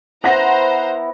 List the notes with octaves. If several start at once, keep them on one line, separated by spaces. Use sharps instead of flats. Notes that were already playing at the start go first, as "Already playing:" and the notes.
B3 E4 C5 F#5 A#5 A#6